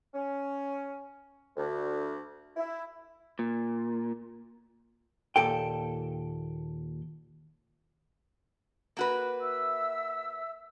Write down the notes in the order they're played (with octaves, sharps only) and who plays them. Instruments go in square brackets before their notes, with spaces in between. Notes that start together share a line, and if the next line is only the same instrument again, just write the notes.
[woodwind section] C#4
D2
E4
[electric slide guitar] A#2
[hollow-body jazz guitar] D#2 A#2 A4 G5
[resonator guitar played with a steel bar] A#3 F#4 B4
[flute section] E5 E6